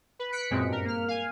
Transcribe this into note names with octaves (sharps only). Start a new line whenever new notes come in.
B4
F#6 B6 C#7 D7
F#2 A#2 G#3 C4
G2 A#4
A#3 F6
F5 G#5